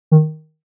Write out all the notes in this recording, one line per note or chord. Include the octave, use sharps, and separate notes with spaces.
D#3